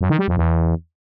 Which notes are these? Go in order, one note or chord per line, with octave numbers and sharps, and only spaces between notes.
F#2
D#3
G3
F2
E2